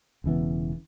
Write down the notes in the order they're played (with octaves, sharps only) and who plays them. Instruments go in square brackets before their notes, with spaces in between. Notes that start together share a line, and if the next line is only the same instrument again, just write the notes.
[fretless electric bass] E1 C#3 E3 B3